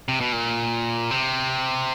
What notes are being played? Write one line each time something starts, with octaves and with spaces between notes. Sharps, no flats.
C3
B2
A#2
C3